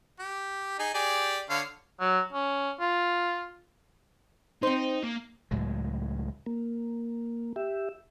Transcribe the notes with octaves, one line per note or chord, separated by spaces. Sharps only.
G4
D#4 G#4
G4 G#4 D5
D3 C#5 F5
F#3
C#4
F4
C4 D#4 C5
A#3
C#2 A2 F#3 G#3
A#3
G4 E5